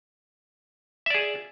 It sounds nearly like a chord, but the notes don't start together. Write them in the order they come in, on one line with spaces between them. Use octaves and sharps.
E5 D5 G#4